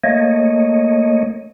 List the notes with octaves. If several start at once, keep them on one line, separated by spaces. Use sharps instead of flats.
A3 A#3 C#5 D#5